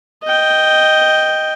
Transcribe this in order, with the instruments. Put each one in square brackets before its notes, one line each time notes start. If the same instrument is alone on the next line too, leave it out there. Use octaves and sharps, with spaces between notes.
[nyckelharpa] D#5 G5